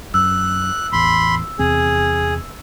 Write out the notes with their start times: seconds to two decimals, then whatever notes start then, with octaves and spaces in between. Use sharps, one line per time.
0.14 F#2 E6 F#6
0.92 A1 E2 B5 C6
1.59 E2 C3 C4 G#4